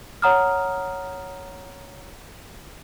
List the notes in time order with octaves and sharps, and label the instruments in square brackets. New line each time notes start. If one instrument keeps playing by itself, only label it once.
[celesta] C#5 F#5 A#5 D#6 F6